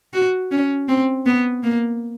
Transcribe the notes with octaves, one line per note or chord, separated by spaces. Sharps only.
F#4
C#4
C4
B3
A#3